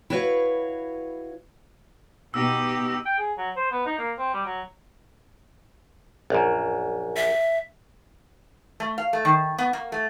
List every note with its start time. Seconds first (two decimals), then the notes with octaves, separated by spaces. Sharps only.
0.10 E4 F#4 B4 C#5 F5
2.34 B2 D#4 G4 E6
3.06 G5
3.18 G#4
3.38 F#3
3.56 C5
3.71 B3
3.86 D#4
3.99 A#3
4.18 C4
4.34 G3
4.46 F#3
6.30 A#1 F#2
7.16 E5
8.80 A3
8.98 F5
9.13 A3
9.25 D#3
9.58 B3
9.73 A#3
9.92 A3